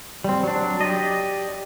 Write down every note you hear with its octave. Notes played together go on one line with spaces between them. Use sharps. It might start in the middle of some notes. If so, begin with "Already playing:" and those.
G3 C4
F#3 D4
G4 D5 D#5